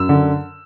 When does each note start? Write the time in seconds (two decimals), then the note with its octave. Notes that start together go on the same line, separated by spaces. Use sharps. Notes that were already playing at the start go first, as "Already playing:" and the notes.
Already playing: F#2 E6
0.09 D3